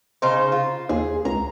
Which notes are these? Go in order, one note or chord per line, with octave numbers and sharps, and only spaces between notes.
C#3 D#4 C5
F4
D#2 G#4
C#2 A#5